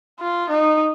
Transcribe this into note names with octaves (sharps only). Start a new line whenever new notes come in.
F4
D#4